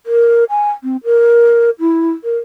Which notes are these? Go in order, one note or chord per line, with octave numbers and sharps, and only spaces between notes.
A#4
G#5
C4
A#4
E4
A#4